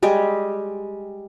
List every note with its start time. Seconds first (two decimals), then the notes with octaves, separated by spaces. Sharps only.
0.03 G3 G#3 G4